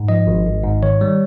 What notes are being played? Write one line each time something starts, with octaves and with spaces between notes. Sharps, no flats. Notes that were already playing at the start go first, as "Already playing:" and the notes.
Already playing: G#2
F3 D#5
G#1
G#1
G#2
D#3 C#5
G3